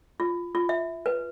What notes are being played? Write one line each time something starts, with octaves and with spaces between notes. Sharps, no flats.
F4
F4
E5
B4